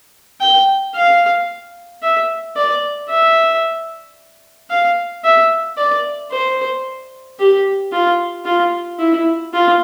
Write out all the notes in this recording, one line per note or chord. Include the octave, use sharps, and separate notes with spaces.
G5
F5
E5
D5
E5
F5
E5
D5
C5
G4
F4
F4
E4
F4